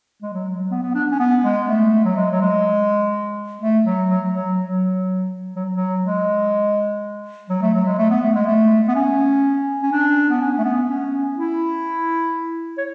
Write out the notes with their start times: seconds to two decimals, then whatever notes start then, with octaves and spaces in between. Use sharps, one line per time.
0.22 G#3
0.33 F#3
0.55 F#3
0.71 B3
0.82 B3
0.95 D4
1.12 C#4
1.19 B3
1.44 G#3
1.68 A3
2.05 F#3
2.16 G#3
2.31 F#3
2.41 G#3
3.62 A3
3.85 F#3
4.10 F#3
4.33 F#3
4.58 F#3
5.56 F#3
5.73 F#3
6.03 G#3
7.49 F#3
7.62 A3
7.73 F#3
7.85 G#3
7.98 A3
8.10 B3
8.22 A3
8.35 G#3
8.46 A3
8.88 B3
8.96 C#4
9.83 C#4
9.92 D4
10.30 B3
10.41 C#4
10.58 A3
10.64 B3
10.89 C#4
11.38 E4
12.78 C#5